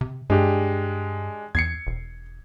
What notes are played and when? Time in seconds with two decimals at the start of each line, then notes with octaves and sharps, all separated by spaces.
0.01 C3
0.30 G2 G#3 D4 G4
1.55 E2 G#6 C7 C#7
1.87 E1